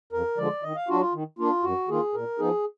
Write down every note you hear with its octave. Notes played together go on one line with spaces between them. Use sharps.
F2 A#4
D3 F3 G#3 D5
D#3 D#5
F5
F#3 D4 F4 F#4
F4
D#3
A#3 D4 F4
F#2 F#4
D#3 A#3 F4 G#4
A#2 A#4
F3 B3 D#4 G#4